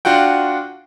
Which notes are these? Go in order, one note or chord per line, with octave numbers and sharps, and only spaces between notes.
D4 F4 F#4 F#5 G5